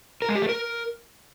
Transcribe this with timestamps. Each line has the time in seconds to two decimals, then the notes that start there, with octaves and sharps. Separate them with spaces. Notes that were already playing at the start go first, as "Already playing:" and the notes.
0.22 A#4
0.29 G#3
0.35 G4
0.42 A3
0.49 A#4